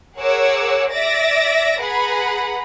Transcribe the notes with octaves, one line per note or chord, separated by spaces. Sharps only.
G#4 A#4 C#5 F#5 D6 E6
D5 E5 A6 A#6 D7
G#4 B4 F#5 A#5 B5